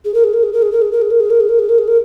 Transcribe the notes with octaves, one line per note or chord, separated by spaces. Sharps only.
G#4
A#4
G#4
A#4
G#4
A#4
G#4
A#4
G#4
A#4
G#4
A#4
G#4
A#4
G#4
A#4
G#4
A#4
G#4
A#4